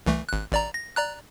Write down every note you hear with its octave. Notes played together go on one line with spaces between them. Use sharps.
C2 E3 A3
G#1 F#6
A1 D5 A#5
A#6
D5 A#5 F#6